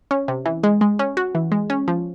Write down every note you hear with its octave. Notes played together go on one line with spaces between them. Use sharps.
C#4
C3
E3
G#3
G#3
C#4
F#4
E3
G#3
C#4
F3